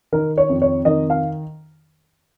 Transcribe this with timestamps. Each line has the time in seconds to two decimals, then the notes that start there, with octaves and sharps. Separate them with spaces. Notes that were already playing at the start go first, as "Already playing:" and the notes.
0.12 D#3 A#4
0.38 C#5
0.49 F2
0.62 C#5
0.85 D#3 D#5
1.10 F5